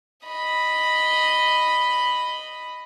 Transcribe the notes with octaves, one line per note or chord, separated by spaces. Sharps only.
D#5 B5